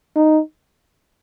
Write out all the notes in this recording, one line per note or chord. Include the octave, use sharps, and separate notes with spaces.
D#4